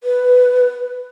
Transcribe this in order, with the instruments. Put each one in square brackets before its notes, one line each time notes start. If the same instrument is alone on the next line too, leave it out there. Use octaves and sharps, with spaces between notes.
[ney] B4